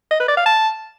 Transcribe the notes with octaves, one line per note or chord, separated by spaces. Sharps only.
D#5
B4
D5
F5
A5